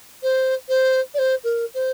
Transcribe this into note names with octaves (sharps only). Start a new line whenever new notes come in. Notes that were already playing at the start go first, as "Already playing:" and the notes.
C5
C5
D5
C5
A#4
C5